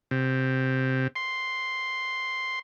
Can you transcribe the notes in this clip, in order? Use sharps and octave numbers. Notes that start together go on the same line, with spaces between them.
C3
C6